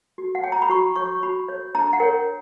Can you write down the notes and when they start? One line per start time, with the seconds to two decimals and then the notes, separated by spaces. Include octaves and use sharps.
0.18 F#4
0.35 F#5
0.44 C#5 G5
0.52 A#5
0.62 B5
0.70 F#4 C#6
0.96 C#5 C#6
1.23 F#4 B5
1.49 C#5
1.75 D4 A#5
1.93 F#5
2.00 A#4 C#5 G5